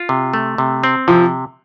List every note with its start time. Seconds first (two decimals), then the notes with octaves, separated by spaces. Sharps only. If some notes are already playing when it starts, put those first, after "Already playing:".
Already playing: F4
0.09 C3
0.34 A3
0.58 C3
0.84 C4
1.08 C3 F3